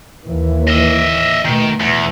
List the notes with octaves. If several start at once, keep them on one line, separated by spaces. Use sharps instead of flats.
D#2 E3
D#5 E5
B2 D#3 A3
E2